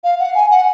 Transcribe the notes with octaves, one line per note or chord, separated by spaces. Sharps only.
F5
F#5
G#5
F#5